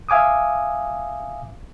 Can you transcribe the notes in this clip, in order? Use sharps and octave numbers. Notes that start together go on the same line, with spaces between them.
E5 F5 G#5 D6 D#6